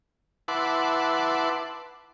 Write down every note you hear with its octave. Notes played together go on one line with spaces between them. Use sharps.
E4 B4 F#5 A5 C6 D6